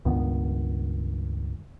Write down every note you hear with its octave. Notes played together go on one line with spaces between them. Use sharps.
C#2 G2 D#3 B3